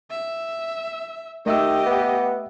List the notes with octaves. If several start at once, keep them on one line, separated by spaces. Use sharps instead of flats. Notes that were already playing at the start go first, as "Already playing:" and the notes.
E5
D#3 A3 G4 D#5 E5 E6
B3